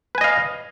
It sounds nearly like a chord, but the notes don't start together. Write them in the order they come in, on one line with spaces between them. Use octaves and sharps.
B4 G#5 D#5 F5